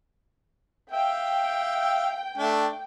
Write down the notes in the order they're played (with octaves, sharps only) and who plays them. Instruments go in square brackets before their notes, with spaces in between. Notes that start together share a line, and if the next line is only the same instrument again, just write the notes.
[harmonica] E5 F5 [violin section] G5
[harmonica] A3 D4